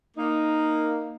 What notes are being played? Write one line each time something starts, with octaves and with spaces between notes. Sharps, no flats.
A#3 D#4